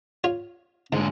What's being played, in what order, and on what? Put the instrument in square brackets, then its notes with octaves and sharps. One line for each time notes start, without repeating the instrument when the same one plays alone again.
[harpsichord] F4 C#5
[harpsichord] G#2 [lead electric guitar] D3 G#3